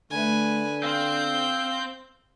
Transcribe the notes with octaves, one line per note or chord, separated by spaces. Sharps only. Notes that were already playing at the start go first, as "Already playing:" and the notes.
D3 A3 B4 G#5
C4 C5 F5 G6